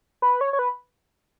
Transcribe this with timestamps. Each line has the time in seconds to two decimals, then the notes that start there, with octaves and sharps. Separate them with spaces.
0.22 B4
0.41 C#5
0.53 C#5
0.59 B4